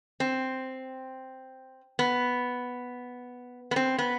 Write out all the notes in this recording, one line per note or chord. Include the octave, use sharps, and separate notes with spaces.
C4
B3
B3
C4
B3